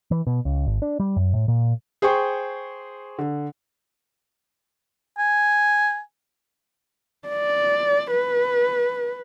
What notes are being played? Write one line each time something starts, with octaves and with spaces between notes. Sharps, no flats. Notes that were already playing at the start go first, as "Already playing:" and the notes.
E3
B2
C#2
G#1
D4
G3
F#2
A2
A#2
G#4 C5 G5 C#6
D3
G#5
D5
B4